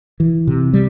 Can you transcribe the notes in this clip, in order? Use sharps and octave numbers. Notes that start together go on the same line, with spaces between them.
E3
C3
G3